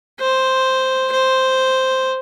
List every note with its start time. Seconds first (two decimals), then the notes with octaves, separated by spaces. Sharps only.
0.20 C5
1.12 C5